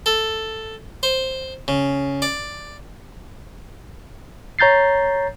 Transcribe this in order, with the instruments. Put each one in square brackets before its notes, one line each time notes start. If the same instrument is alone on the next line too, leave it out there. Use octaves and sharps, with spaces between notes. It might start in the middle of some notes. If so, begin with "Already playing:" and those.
[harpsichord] A4
C5
C#3
D5
[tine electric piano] C#5 A#5 G6 A6 C7